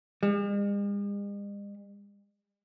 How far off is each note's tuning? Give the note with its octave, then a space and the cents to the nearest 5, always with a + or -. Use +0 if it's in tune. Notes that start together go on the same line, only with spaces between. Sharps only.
G#3 -45